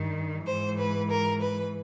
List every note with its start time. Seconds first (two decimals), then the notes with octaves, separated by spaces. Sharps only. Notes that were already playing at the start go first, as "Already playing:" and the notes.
Already playing: G2 D#3
0.46 G#2 E3 C5
0.79 B4
1.10 A#4
1.41 B4